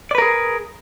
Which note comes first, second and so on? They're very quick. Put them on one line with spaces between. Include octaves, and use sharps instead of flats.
D5 B4 A#4 G#4